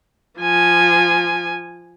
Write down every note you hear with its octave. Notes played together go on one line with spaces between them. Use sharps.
F3 G#5